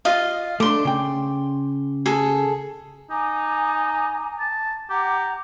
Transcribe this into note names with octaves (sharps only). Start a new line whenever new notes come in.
F4 D#5 F5
A3 D4 C6 D6
C#3 G5
G#4 A4
D#4 G#5 A#5 D6
A5
G4 F#5 A#5 D6